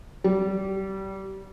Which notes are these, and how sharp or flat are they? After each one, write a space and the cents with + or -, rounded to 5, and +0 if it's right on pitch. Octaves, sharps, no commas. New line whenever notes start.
G3 -25